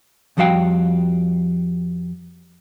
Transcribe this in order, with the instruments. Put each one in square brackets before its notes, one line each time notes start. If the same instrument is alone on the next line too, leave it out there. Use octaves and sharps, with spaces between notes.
[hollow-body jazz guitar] F2 F3 G3 F#4 F5 G5